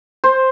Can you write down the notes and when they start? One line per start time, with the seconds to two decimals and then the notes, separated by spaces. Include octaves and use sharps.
0.24 C5